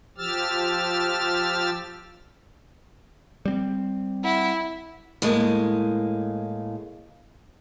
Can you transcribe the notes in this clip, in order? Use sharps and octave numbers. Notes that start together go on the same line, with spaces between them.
F3 G4 E6 F6 A6
G3 C4
E4 F#5
A2 G#3 A#3